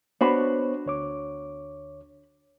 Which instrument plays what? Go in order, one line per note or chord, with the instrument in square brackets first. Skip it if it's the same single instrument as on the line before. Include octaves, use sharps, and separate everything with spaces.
[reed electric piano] B3 C5 C#5 [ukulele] D4 F#4 B5
[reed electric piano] D2 C#5 D6